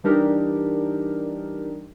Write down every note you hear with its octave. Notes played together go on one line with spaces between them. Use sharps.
E3 G3 D4 D#4 G4 A#4